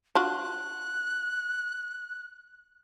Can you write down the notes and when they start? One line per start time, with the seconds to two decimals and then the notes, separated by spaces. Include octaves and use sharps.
0.15 D4 F4 F#4 F#6